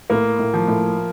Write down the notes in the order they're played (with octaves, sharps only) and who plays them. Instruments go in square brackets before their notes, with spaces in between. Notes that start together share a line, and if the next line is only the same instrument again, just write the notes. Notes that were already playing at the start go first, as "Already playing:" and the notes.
[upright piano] A2 [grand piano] A#3
[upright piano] A2
[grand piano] F3
[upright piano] A2